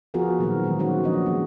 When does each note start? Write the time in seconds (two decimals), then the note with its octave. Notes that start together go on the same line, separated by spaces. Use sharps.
0.14 F3 B3 F4 F#4 G#4 A#4
0.39 A#2 D#3 F#3 A#3 F#4 A#4
0.64 D#3 E3 F#3 G#3 B3
0.79 G#3 C#4 F#4 C5
1.04 F3 G#3 A#3 D4 D#5
1.26 E3 F3 G#3 A#3 D4